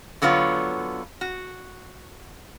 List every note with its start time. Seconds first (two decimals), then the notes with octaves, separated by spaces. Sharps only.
0.22 D3 F#3 B3 F4 C#5
1.21 F#4